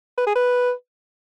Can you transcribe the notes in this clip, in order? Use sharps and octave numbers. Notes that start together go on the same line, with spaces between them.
B4
G#4
B4